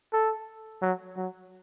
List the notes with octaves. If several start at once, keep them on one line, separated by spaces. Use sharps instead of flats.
A4
F#3
F#3